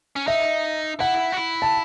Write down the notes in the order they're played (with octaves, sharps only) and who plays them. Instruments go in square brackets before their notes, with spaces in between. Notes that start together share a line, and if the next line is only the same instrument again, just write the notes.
[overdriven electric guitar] C#4
[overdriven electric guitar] D#4 [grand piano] E5
[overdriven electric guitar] E4 [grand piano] F#5
[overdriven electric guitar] F#4
E4
[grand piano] A5